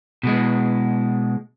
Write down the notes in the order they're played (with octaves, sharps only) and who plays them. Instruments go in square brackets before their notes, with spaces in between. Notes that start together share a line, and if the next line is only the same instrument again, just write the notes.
[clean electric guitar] B2 G#3